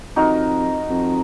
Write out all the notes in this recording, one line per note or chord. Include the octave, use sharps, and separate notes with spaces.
F2 D#4 F#4 A#4
F2